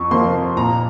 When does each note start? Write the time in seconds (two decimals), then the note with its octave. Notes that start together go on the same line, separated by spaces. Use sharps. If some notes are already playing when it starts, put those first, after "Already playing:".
Already playing: F2 C#6
0.11 C3 F3 A#3 C6
0.56 A#2 A#5